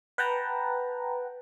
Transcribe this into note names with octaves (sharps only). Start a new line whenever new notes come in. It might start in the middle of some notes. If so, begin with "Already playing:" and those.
B4 F#5 G5 A5 A#5